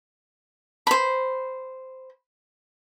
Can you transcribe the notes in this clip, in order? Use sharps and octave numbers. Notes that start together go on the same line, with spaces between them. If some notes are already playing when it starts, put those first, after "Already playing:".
C5 B5